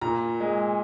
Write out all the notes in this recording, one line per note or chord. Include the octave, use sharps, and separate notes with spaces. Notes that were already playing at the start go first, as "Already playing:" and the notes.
A#2 A#5
G#3